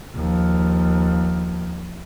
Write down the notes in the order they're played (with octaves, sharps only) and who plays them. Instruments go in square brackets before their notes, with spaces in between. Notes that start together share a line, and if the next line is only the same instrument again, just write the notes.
[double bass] D#2 F3